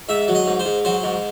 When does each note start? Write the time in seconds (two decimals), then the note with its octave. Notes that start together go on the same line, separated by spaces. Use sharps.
0.09 G#2 E5
0.28 F#3
0.35 D#5
0.47 G#2
0.59 C5
0.65 G#2
0.85 F#3 C5
1.03 G#2